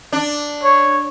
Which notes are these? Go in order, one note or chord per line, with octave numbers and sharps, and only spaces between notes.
D4
C#5